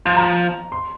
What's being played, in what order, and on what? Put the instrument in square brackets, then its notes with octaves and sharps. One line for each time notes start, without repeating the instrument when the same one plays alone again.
[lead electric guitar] F3 [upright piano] C6
[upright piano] A#5
C6